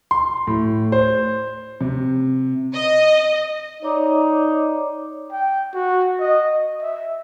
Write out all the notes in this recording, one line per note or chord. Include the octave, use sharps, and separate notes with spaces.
C6
A2
C5
C3
D#5
D#4 C#5 D5 D6
G5
F#4
D#5
E5